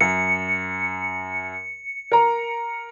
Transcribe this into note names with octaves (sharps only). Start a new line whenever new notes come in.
F#2 C#7
A#4 A#5